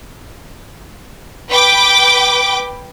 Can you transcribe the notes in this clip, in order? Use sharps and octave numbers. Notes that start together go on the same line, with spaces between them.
B4 G5 D6